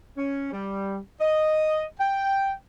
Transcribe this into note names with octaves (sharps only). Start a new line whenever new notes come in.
C#4
G3
D#5
G5